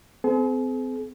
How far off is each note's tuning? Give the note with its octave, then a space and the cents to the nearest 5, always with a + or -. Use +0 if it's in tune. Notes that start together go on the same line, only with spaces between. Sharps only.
C4 -35 G#4 +45